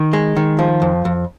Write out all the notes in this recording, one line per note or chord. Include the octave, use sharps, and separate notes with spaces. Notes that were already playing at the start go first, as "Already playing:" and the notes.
Already playing: D#3
G#3
D#3
F3
F2
F2